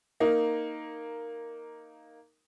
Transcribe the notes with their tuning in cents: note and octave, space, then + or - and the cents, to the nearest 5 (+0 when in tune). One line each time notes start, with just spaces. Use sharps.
A#3 +0 D#4 +0